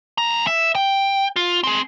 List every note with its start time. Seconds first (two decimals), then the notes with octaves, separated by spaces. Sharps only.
0.18 F2 A#5
0.47 E5
0.75 G5
1.36 F4
1.64 C4 G#4